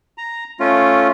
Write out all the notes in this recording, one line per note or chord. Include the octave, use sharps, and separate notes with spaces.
A#5
A3 C#4 F4